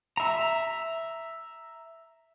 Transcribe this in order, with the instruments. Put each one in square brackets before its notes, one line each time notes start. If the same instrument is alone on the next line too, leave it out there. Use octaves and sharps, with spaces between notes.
[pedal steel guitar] E5 A#5